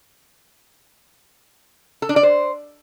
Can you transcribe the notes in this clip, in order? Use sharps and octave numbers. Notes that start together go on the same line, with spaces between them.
A4
D4
D5
C5